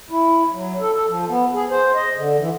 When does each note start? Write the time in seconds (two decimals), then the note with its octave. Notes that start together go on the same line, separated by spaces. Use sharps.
0.10 E4
0.52 F#3
0.80 A4
0.94 A4
1.08 F3
1.29 B3
1.53 G#4
1.70 C5
1.95 D#5
2.16 D3
2.38 E3